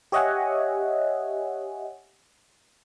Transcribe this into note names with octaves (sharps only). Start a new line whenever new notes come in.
G4 C#5 D#5 E5 F#5 G#5